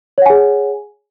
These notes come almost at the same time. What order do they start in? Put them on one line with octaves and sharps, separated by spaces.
C#5 F#5 G#5 G#4